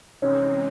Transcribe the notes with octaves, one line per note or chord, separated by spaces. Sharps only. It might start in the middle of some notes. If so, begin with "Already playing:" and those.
C3 E3 G#3 C4 C#4 D#4